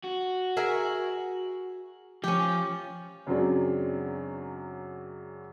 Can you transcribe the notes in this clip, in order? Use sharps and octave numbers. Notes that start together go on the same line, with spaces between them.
F#4
G#4 A#4 E5
F3 C#4 G4
F#2 C#3 F#3 G#3 C4 D4